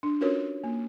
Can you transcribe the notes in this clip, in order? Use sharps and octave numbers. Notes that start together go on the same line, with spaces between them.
D4
C#4 F4 F#4 A#4 B4 C#5
A#3